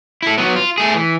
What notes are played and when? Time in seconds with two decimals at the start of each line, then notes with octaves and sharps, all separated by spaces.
0.22 E4 A4
0.38 F#3 B3
0.56 F4
0.78 A3 G#4
0.94 E3